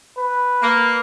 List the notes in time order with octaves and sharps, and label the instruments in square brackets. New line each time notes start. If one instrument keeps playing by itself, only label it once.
[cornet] B4
[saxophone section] A#3